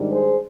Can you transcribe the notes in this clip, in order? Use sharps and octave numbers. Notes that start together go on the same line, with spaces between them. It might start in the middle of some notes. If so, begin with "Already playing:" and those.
Already playing: G#2 D#3 G3 D4
G#4 C5